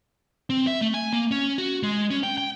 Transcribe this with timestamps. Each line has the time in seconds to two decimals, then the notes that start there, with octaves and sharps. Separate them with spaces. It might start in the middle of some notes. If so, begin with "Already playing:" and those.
0.50 C4
0.67 E5
0.81 A3
0.94 G#5
1.13 A#3
1.31 C#4
1.58 F#4
1.83 G#3
2.11 C#4
2.23 G5
2.38 G5